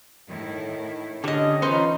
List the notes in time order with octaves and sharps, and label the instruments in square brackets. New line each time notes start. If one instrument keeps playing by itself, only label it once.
[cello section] A2 D#3 E4
[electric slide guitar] D3 [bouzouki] G3 D#5 [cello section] C#4
[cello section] E3 F4 [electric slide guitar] C#4 [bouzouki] D#4 B4 C5